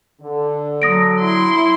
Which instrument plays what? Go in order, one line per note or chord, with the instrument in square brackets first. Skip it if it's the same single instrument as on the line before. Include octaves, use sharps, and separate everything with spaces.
[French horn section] D3
[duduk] F#3 [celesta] D#6 A#6 D7
[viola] E4 C6